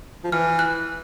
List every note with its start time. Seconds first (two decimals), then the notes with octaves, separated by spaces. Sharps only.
0.24 F3
0.32 E3 F6
0.59 F#6